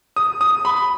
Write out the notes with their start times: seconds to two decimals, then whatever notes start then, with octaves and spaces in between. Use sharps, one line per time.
0.16 D#6
0.41 D#6
0.65 B5